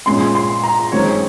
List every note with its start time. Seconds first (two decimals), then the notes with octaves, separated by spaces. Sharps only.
0.06 A#2 G#3 C#4 C6
0.35 C6
0.64 A#5
0.92 F#2 D#3 G#3 C4 C#5